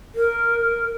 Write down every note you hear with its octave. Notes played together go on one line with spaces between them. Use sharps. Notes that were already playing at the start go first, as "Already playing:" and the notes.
A#4